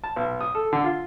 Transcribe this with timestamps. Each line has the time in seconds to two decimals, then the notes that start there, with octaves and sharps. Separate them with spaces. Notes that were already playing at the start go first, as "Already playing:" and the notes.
0.04 A5
0.16 B1
0.41 D#6
0.55 A4
0.73 D3
0.84 F4